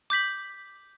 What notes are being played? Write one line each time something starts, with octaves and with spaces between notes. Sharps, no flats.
D6 G6 B6 F#7